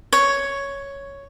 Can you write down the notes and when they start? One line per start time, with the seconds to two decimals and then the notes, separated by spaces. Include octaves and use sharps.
0.13 C#5